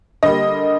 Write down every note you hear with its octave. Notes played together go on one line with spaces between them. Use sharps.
D3 G3 A#3 D#5